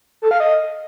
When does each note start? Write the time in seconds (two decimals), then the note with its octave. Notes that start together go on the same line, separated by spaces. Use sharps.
0.22 A4
0.31 F5
0.40 D#5